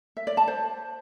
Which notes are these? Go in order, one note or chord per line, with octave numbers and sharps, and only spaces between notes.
E5
D5
A5
C5